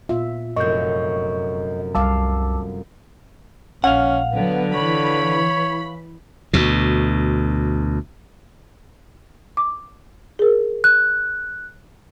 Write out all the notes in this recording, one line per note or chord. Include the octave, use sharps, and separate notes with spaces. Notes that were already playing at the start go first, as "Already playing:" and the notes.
A#2 B3 F4 E5
F1 F#2 D#5 C#6 G6
C2 G3 F5 A5 D6 E6
A#1 C#4 F5 F#5
D3 F#3 B3
E3 C#5 B5
D2 B2
D6
G#4 A#4
F#6